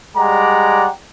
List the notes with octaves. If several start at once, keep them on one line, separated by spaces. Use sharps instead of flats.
G3 G#3 D5 F#5 G5 A#5